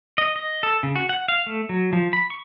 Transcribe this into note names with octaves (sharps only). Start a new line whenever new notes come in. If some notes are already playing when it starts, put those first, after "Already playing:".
D#5
D#5
A4
C#3
F#4
F#5
F5
A3
F#3
F3
B5
C#6